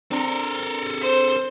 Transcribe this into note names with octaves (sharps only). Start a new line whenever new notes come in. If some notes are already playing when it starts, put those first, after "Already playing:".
C4 D4 A4 A#4 C6
C5